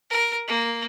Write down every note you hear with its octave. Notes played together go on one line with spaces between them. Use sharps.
A#4
A#3